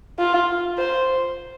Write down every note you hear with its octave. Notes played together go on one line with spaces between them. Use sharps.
F4
C5